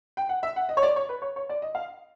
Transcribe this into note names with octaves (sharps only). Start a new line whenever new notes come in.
G5
F#5
E5
F#5
D#5
C#5
D5
C#5
B4
C#5
C#5
D5
D#5
F5